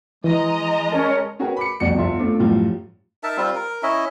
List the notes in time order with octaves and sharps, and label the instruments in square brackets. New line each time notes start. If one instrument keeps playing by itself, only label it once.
[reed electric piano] E3 [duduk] G#3 [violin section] D#5 A#5
[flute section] C#4 C#5 [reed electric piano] G#4 A#4 A5
[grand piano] C#4 F#4 G#4 A#4 B4 G5
B5 D6 C#7
E1 C2 F2 F#4 D5 C#7
G1 F4 E5 C6
A3 C4 D4 F4 D6
F#2 A2 F3 G3
[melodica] D#4 A#4 E5 A5
G3 C4 F4
A#4
C#4 E4 D#5 E5